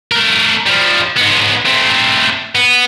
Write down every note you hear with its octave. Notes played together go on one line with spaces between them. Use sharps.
A3 A#4
F3 G3
G#2 B3
A3 C4
B3